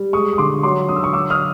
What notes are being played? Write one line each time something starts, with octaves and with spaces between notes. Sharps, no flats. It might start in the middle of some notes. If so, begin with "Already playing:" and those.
Already playing: G3
G#3 C#6 D#6
D#6
D3 C6 D6
F#3 C6 D6
D3 D#6
E6
C#6 D#6
F#3 D6 E6
D#6 F6